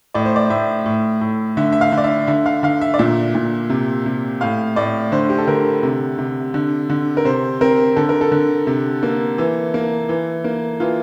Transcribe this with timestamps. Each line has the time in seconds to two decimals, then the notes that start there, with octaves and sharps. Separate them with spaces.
0.14 A2 D5
0.25 C5
0.36 D5
0.50 A2 E5
0.86 A2
1.21 A2
1.57 D3 E5
1.73 E5
1.81 F5
1.92 D3
1.98 D5
2.04 E5
2.27 D3 E5
2.46 F5
2.63 D3 F5
2.81 E5
2.94 D5
2.99 A#2 E5
3.35 A#2
3.70 C3
4.06 C3
4.41 A2 F5
4.76 A2 D5
5.12 D3 C5
5.29 G4
5.38 A4
5.47 D3 A#4
5.83 C3
6.18 C3
6.54 D3
6.90 D3
7.17 A#4
7.25 C3 C5
7.61 C4 A#4
7.96 D3 A4
8.09 A#4
8.21 A4
8.32 D3
8.67 C3
9.03 A#3
9.38 E3
9.74 A#3
10.09 E3
10.44 A#3
10.80 E3 F4